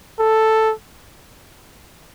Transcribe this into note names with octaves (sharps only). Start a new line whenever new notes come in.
A4